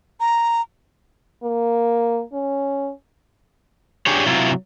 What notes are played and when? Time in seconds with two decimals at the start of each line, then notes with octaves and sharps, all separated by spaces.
0.20 A#5
1.43 A#3
2.33 C#4
4.06 D4 G4 G#4 C#5
4.27 C3 F#3 E4 F4